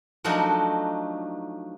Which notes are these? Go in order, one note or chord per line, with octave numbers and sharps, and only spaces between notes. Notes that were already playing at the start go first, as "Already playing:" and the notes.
F3 F#3 A3 D4 D#4 F#4